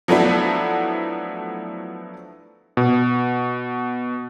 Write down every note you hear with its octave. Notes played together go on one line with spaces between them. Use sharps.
F3 F#3 A3 B3 D4 E4
B2